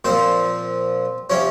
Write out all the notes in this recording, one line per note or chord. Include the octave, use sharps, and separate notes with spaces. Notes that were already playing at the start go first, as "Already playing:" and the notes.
A#2 F3 C4 C5
C3 F3 C#4 C#5